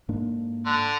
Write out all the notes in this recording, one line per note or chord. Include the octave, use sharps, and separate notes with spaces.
G#2 A#3 D4
D3